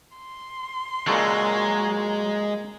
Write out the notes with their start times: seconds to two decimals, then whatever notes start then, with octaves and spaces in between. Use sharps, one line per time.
0.17 C6
1.07 A#2 C#3 F#3 G#3 A4